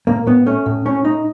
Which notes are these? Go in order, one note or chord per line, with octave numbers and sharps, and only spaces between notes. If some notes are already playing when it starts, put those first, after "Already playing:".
A2 A#3
A2 B3
A3 C#4
A2
A2 C#4
A2 D#4